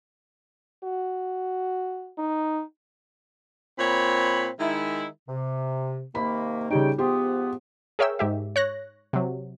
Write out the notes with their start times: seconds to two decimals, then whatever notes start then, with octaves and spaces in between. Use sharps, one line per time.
0.84 F#4
2.18 D#4
3.79 A#2 C4 C#5 B5
4.59 D#3 G#3 D#4 E4
5.29 C3
6.15 C3 D#3 A#3 B5
6.70 C#3 G3 D#4 C#5 G5
6.98 G#2 F3 B3 G4 C6
7.99 G#4 A#4 C#5 E5 G5 E6
8.19 G#2 G4 E5
8.56 C#5 F#6 A#6
9.13 C3 F#3